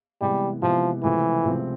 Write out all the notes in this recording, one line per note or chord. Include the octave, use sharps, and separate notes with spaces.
C3 E3 G3 G#3 B3
C3 E3 F3 G#3 B3
C#2 C3 E3 F3 A3 C4
C#2 C3 F3 A3 C4